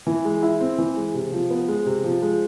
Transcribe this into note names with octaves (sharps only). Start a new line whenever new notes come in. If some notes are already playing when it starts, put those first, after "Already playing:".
E3
G#3
E4
C4
E3
G#3
C3
F3
B3
G#3
C3
F3
G#3